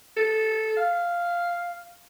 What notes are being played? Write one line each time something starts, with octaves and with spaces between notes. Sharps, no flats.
A4
F5